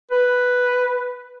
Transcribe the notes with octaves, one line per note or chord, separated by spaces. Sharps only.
B4